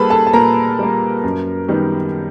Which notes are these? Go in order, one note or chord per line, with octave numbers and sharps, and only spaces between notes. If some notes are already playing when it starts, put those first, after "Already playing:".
Already playing: G3 A#3 G#4 A4 B4 A5 B5
A4 A5
A5
A#2 A#4 A#5
G3 A#3
F#2
D#3 G3 B3